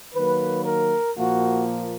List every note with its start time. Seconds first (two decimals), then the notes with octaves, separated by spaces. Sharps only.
0.14 D#3 F#3 A#3 B4
0.65 A#4
1.16 A#2 F3 A#3 F#4